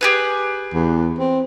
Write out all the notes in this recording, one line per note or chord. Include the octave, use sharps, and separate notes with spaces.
G4 G#4 B4
E2
C4